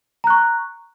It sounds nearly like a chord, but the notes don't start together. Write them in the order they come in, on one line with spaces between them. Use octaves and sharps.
A#5 F#6 C#6